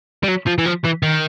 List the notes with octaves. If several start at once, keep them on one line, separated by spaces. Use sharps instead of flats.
G3
F#3
F3
E3
F3
E3
D#3